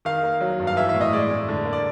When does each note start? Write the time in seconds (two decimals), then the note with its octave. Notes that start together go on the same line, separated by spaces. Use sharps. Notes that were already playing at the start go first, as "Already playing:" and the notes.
0.05 D#3 F5
0.23 A#3
0.41 F#3
0.60 G2
0.67 F5
0.76 E3 E5
0.89 E5
0.94 A2
1.01 D#5
1.13 G#3 D5
1.30 A2
1.49 D3
1.65 A#3
1.73 D5